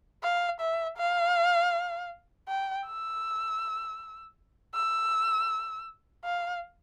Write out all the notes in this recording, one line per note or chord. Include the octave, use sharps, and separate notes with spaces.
F5
E5
F5
G5
E6
E6
F5